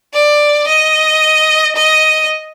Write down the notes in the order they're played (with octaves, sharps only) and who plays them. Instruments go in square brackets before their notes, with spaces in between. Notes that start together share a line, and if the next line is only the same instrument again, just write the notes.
[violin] D5
D#5
D#5